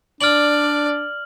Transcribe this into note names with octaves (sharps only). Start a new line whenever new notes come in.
D4 D5 F6 F#7